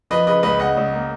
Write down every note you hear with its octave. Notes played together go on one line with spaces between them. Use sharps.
F3 B4 D#5
C#3 B4 D#5
C#2 B4 D#5
C#3 D#5 F#5
C#2
A#3